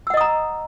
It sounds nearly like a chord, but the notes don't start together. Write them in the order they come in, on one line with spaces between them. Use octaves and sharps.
E6 F#5 D#5 D#6 A#5